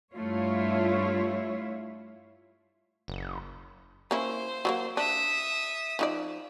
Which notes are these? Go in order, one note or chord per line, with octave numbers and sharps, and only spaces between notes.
G2 A3 E4 F4 C#5
F#1
A#3 C#4 E4 C5
F#3 G3 A#3
D4 E5 D#6
F3 D#4 D5